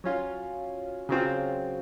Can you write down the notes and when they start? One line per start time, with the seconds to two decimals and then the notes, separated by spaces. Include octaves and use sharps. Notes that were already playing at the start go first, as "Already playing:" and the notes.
0.04 F#3 C#4 F4
1.09 C#3 F#3 C4 F4